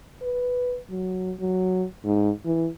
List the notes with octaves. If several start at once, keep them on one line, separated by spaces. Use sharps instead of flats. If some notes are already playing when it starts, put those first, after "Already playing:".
B4
F#3
F#3
G#2
E3